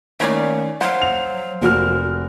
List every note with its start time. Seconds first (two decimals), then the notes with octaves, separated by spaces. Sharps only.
0.20 D#3 A3 A#3 C#4 C#5 D5
0.81 F#3 C5 F5 F#5
1.02 F7
1.62 F1 F#4 A#4 F6